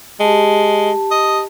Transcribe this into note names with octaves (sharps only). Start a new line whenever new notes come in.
G#3 G4 A5
D#5